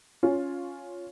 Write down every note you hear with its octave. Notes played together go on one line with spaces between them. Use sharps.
C#4 F4